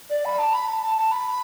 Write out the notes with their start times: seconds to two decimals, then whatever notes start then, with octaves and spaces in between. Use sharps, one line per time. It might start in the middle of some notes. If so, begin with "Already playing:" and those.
0.10 D5
0.25 B5
0.39 A5
0.53 B5
0.69 A5
0.82 A5
0.98 A5
1.11 B5